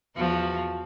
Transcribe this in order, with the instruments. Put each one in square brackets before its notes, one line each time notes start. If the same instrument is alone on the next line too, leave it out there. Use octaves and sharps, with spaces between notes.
[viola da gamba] E2 F3 F#4